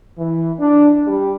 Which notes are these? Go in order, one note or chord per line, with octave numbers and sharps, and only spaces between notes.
E3
D4
G3